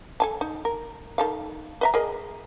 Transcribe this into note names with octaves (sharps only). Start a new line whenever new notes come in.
A4 G#5 A5
D#4
A#4
D#3 A4 F5
B4 E5 A#5
G#4 A#4 D#5